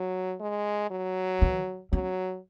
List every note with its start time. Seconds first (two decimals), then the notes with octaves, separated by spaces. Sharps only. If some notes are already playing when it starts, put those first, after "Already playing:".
Already playing: F#3
0.40 G#3
0.90 F#3
1.42 E3
1.92 F#3 C#4